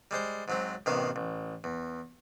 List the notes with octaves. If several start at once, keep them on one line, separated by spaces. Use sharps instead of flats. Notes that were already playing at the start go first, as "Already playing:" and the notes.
G3 G#3 C5 C6
G#2 F#3 C4
A1 C3 D#3 B3 F5
A1
E2